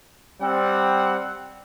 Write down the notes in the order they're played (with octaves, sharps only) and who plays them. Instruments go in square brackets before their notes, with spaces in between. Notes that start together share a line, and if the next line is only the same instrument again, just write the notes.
[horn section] G3 C4 F#5